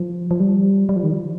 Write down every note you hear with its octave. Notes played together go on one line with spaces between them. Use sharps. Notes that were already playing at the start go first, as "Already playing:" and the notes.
Already playing: F3
F3
G3
G3
F3
D#3
F3